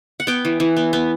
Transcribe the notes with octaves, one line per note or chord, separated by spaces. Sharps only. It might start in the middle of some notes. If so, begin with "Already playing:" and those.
F#5
B3 G5
E3
E3
B3
B3